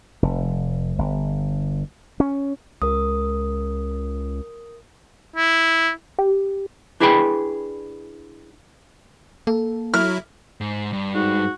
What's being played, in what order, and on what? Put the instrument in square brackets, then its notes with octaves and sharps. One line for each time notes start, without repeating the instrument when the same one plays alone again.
[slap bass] F1
G1
C#4
[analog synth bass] C#2 [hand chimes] A#4 D#6
[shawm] E4
[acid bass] G4
[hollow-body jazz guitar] D4 E4 G#4 B4 G5 B5
[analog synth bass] A#3 [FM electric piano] A4
[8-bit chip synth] F#3 E4 [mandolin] F6
[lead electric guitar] G#2
G2
[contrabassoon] G#2 [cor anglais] F#4